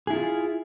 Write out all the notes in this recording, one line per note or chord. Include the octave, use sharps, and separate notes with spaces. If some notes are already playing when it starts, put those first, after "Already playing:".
E4 F4 G#4